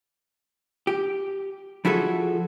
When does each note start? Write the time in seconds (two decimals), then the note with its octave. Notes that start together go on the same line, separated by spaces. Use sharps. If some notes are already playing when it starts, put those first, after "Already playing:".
0.87 G4
1.85 F3 E4 F#4 G#4 A4